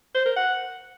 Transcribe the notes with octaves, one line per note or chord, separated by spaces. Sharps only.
C5
A#4
F#5